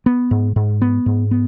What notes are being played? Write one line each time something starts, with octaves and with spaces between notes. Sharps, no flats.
B3
G#2
G#2
B3
G#2
B3